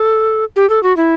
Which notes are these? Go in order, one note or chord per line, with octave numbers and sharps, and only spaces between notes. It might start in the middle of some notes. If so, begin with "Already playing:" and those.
Already playing: A4
G4
A4
F#4
E4